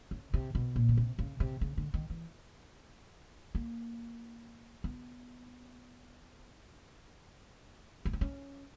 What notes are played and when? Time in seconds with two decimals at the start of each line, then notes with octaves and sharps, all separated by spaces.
0.11 C#3
0.34 C3
0.55 B2
0.76 A#2
0.89 C#3
0.97 C3
1.19 C#3
1.40 C3
1.61 C#3
1.77 D3
1.94 D#3
2.10 E3
3.55 A#3
4.84 B3
8.05 C#4
8.13 C4
8.21 C#4